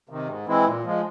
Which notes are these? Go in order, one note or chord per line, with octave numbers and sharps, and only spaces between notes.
C3 D#3
G#2
E3 G#3 C4 E4
A#2
F3 G#3